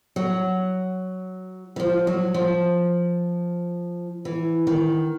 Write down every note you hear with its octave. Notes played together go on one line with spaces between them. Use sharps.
F#3
E3
F3
F#3
F3
E3
D#3